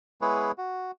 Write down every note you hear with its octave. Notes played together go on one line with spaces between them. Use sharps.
G#3 B3 E4 G#4 B4 C#5
F#4